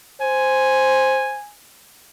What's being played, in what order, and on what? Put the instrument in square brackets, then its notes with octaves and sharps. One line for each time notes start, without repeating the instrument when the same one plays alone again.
[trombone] C5 [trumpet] G#5